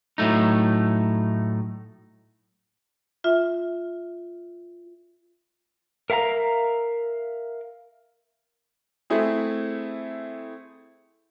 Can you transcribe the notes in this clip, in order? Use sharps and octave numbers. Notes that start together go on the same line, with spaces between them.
A2 F#3 A3 D#4
F4 E5
A#4 E5 F5 G#5 A#5
A3 C4 E4 G#4